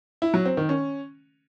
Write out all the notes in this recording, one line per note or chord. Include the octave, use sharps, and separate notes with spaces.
E4
F#3
C4
D#3
C#4